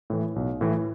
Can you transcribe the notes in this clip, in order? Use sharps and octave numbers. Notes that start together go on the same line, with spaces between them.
A2 E3
B1
A2 E3